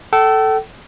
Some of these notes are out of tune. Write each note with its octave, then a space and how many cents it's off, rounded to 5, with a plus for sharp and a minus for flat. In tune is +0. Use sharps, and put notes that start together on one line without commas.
A4 +0 G5 -40